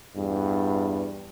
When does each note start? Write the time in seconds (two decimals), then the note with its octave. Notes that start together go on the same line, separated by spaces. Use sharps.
0.16 E2 G2